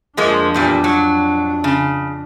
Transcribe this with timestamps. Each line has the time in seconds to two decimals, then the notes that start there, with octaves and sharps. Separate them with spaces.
0.17 F2 F3 G#3 A#3 D4
0.54 E2 A#2 G3
0.84 F#3
1.64 C#3